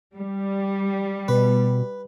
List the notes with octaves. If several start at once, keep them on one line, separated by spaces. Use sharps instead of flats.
G3
B2 B4